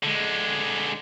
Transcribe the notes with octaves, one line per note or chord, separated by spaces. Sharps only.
D3 G#3